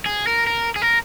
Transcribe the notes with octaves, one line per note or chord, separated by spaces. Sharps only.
G#4
A#4
A#4
G#4
A#4